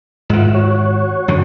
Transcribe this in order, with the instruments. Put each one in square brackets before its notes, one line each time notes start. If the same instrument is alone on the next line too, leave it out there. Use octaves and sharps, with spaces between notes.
[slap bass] G#2 D#3 [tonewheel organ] F4 E5 F#5
[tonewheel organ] F#4 C#5
[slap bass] F#2 D3 D#3